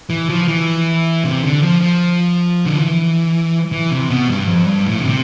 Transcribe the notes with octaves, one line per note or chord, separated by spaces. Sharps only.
E3
F3
E3
C3
D3
F3
F3
D3
E3
E3
C3
B2
G2
F2
G2
A2
D3
C3